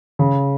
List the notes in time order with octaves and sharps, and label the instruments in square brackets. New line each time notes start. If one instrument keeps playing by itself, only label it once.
[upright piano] C#3